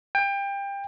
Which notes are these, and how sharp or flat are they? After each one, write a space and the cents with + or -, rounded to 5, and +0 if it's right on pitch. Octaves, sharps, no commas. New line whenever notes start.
G5 +25